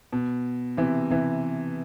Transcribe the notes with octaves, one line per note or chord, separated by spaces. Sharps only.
B2
C3 E3
C3 E3